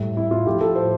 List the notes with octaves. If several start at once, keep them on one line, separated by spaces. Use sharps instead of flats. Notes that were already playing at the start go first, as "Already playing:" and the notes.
Already playing: A2 G3
E4
F4
A2 F3 G4
A4
C5